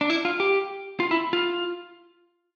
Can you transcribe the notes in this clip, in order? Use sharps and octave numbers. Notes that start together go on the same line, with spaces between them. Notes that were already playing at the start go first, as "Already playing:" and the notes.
D4
E4
F4
G4
F4
E4
F4